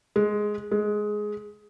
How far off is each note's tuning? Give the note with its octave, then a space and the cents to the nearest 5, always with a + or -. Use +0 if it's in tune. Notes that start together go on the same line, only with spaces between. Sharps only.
G#3 +5
G#3 +10